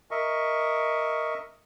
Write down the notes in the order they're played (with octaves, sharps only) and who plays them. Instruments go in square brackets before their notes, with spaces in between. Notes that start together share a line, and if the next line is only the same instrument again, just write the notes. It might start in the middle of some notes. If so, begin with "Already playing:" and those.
[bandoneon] A#4 D#5 E5 C#6